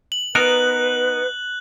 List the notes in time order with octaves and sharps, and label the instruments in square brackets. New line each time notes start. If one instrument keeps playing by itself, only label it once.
[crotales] F#7
[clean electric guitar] B3 D#4 A#4 [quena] B4 [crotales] F#6